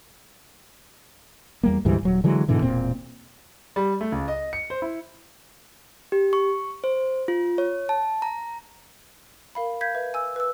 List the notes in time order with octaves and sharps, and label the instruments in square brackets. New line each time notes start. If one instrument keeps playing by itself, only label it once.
[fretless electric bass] E2 G3 A#3
D2 G#2 E3 G3
D#1 F#3
D3 E3 F#3 G#3
G#2 B2 D3 E3
E1 A#2 C4
[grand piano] G3
A3
C#2
D#5
C#7
C5
E4
[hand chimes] G4
C#6
C5
F4
C#5
A5
A#5
[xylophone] A#4 F5 B5
F5 G6 G#6 B6
B4 E5
G#5 E6
B4 E6